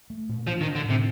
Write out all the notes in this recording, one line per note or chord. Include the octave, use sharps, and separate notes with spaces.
A3
A#2
F3 D4
D#3
D4
D3
A2 C3